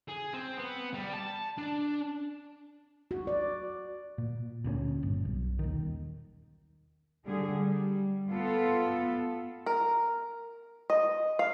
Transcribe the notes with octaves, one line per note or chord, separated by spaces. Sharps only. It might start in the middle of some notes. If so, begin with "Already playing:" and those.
G#4
C4
B3
G3
A5
D4
F#4
D5
A#2
D2 A#2 A#3 C#4
G1
B1
D#1 D#3
D3 G3 G#4
G3
B3 F4 A4
A#4
D#5
F5